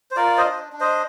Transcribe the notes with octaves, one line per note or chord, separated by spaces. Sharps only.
C5
F4 A#4 D5
C5 D#5
D4
D4
C5 D#5